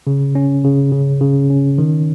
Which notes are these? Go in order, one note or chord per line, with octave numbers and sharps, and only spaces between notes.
C#3
C#4
C#3
C#3
C#3
C#4
D#3